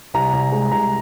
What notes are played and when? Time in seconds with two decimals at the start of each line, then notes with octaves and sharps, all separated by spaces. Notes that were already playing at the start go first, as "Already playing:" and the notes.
0.14 C2 A#5
0.33 C2
0.52 G#3
0.71 C2 A#5